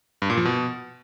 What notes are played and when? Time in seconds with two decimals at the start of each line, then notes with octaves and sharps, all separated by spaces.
0.22 G2
0.30 A#2
0.38 F3
0.45 B2